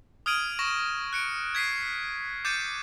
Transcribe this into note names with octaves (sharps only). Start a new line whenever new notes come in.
D#6 F6 G#6 D7 D#7 F#7
C#6 A#6 E7
F#6 C#7 D7
G#6 B6 C7 D#7
D6 G6 A6 C#7 D#7